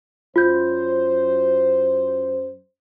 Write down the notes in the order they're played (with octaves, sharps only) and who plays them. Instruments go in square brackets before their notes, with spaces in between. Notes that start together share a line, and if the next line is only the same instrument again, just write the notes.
[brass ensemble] F#2 C5 [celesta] F4 G6